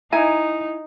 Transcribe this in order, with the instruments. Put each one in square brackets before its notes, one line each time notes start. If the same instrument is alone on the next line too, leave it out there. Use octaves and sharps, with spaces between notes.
[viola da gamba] D#4 [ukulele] E4 G#5 A#5